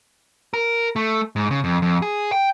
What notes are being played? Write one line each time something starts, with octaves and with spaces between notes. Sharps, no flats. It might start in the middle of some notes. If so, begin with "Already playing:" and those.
A#4
A3
G#2
C#3
F2
F2
G#4
G5